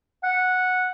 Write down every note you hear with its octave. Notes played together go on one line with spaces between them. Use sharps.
F#5